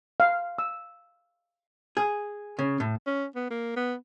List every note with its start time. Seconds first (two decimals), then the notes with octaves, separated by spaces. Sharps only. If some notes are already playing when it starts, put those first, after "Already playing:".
0.20 F5
0.59 E6
1.97 G#4
2.59 C#3
2.80 A2
3.07 C#4
3.35 B3
3.51 A#3
3.76 B3